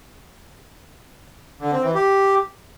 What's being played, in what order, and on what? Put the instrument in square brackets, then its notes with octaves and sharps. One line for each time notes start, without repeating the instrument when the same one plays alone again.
[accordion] D3
C4
E3
G4